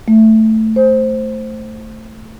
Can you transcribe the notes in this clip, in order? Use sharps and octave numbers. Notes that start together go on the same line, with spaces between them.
A3
C5